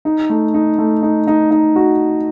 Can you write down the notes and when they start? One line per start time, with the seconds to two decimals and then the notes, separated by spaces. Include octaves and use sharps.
0.05 D#4
0.30 A3
0.54 D#4
0.79 A3
1.02 D#4
1.27 D#4
1.51 D#4
1.76 F#4